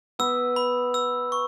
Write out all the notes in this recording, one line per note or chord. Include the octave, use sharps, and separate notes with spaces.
B3 B4 E6
B5
E6
C#6